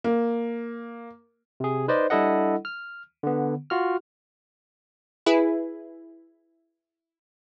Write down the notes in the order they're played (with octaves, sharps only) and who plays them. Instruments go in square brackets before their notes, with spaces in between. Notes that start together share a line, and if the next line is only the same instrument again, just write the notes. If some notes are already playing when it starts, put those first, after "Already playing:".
[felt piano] A#3
[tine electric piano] C3 G#4
D#4 B4 C5 D5 D#5
G3 D4 E4 A4 D#5 F#5
F6
D3 B3
F4 F#4 F6
[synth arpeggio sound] E4 G#4 B4